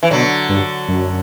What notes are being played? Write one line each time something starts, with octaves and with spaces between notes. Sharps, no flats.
E3
B2 D3 F#3
G2
F#2